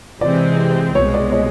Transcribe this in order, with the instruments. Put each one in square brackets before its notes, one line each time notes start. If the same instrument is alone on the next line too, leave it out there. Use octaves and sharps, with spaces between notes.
[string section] C3 E3 G#3 C4 [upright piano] D5
[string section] C2 B2 G#3 [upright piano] C#5
[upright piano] D5
C#5 D#5